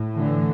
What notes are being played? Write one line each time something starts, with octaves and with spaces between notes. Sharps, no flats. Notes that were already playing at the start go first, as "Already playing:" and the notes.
Already playing: A2
D3 E3